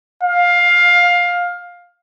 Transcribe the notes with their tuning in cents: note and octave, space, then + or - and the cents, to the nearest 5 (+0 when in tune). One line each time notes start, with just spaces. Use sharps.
F5 +15